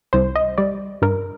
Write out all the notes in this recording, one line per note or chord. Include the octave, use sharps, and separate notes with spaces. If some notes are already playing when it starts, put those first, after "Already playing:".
C2 C5
D#5
G3 D5
G2 A#4